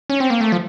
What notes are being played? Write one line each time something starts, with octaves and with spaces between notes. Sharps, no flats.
C#4
C4
A#3
A3
F3